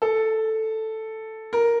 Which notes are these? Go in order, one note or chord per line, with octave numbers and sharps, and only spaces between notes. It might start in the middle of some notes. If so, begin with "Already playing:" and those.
A4
A#4